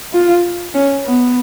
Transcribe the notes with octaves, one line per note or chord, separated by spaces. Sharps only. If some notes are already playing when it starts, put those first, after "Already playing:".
F4
C#4
B3